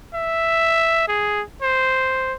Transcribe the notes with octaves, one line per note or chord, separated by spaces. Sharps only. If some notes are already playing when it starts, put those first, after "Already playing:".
E5
G#4
C5